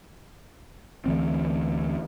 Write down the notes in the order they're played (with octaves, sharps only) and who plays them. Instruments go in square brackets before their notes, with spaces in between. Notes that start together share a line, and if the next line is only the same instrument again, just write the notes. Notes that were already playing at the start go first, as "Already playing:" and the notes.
[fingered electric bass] D2 E3 C4